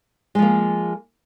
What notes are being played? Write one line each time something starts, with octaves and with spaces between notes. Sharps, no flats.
F3 G#3 A#3